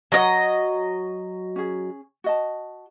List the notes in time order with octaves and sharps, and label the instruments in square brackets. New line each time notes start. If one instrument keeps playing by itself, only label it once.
[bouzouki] F#3 D#5 [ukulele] B4 F#5
[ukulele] C#4 G#4
F#4 D#5 A5